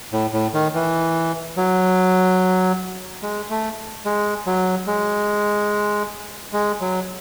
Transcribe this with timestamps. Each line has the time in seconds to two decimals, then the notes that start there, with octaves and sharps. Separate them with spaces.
0.12 A2
0.33 A2
0.54 D#3
0.74 E3
1.57 F#3
3.22 G#3
3.50 A3
4.05 G#3
4.46 F#3
4.87 G#3
6.53 G#3
6.81 F#3